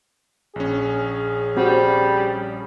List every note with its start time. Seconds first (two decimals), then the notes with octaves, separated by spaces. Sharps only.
0.56 A#1 C#4 G#4
1.57 G3 C4 F#4